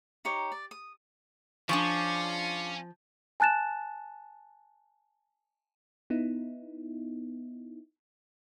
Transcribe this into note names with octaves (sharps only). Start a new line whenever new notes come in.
D#4 G4 C#5 A#5
D5
D#6
F3 C#4 D4 F4 G#4 C#6
G#5 A5 F#6 A6 E7
B3 D#4 E4